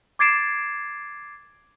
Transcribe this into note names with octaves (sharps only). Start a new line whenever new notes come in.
D6 G#6 A6 C7 D7 E7